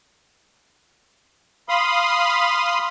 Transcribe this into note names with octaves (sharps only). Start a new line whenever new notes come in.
F5 B5 C6 D#6